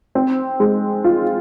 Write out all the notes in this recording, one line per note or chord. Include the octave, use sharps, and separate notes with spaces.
C4
G#3
F4